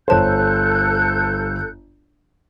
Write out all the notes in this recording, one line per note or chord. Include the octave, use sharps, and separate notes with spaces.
G1 A4 C5 C#5 A5 F#6 G6